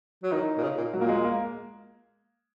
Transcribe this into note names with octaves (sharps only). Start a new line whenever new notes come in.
F#3
D#3 D#4
A#2
C#3
A#2
A#2 F#3
A#3
G#3
A#3